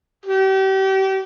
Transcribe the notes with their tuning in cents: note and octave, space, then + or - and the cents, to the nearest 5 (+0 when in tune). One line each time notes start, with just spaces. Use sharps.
G4 -35